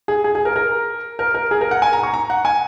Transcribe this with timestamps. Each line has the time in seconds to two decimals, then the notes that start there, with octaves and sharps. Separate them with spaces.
0.08 G#4
0.24 G#4
0.35 G#4
0.45 A#4
0.56 A#4
1.19 A#4
1.35 A#4
1.51 G#4
1.61 A#4
1.71 F#5
1.82 G#5
1.93 A#5
2.03 C#6
2.14 A#5
2.30 F#5
2.45 G#5